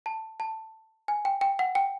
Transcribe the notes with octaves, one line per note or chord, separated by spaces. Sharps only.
A5
A5
G#5
G5
G5
F#5
G5